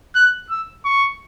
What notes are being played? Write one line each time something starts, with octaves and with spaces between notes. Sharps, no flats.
F#6
E6
C#6